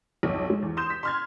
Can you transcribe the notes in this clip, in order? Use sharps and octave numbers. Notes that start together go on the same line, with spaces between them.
B1 F2
G#3
E2
C6 D#6 G6 E7
B6
C6 F6 G#6